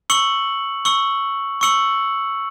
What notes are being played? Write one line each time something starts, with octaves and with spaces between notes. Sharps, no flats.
C#6 E6 C#7 F#7
C#6 E6 C#7 F#7
C#6 E6 C#7 F#7